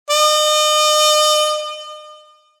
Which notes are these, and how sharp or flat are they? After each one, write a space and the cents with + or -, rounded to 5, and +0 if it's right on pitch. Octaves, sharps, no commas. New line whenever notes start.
D#5 -40